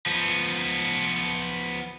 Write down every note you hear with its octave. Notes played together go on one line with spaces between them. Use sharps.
F3 B3